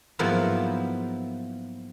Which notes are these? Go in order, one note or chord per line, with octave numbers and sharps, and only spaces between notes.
G#2 F3 F#3 A#3 B3 E4